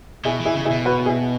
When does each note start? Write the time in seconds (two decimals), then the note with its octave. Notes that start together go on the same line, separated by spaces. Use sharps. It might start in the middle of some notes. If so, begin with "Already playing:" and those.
0.25 B2 E4 G#4
0.40 E3
0.45 E4 G#4
0.55 C#3
0.65 E4 G#4
0.70 B2
0.85 F#4 B4
1.06 E4 G#4